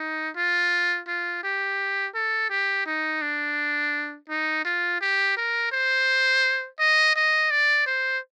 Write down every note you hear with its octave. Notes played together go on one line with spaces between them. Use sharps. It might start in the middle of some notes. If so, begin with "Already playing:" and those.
Already playing: D#4
F4
F4
G4
A4
G4
D#4
D4
D#4
F4
G4
A#4
C5
D#5
D#5
D5
C5